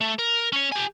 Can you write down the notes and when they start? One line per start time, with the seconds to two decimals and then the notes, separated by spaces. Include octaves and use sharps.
0.01 A3
0.19 A#4
0.52 C#4 C#5
0.72 G4 G#5